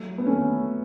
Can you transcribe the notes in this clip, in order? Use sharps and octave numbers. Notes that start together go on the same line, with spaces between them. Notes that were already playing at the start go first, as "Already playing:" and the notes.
Already playing: F#3 A3
B3
A3 C#4